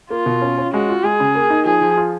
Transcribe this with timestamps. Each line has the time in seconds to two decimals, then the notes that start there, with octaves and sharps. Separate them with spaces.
0.10 A#3 F4
0.26 B2
0.42 C#4
0.58 C#4
0.73 G#3 F#4
0.89 F4
1.04 G#3 G#4
1.20 C#3
1.35 A#3
1.50 D#4
1.65 F3 G#4
1.81 F3
1.97 F4